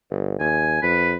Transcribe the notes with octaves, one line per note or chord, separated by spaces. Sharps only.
G1
D#2 G#5
F2 B4